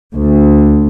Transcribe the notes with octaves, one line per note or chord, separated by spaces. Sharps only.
D2